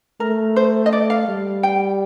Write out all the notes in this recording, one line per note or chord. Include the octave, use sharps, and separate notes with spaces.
A3 A#4
C5
D#5
D5
F5
G3
G5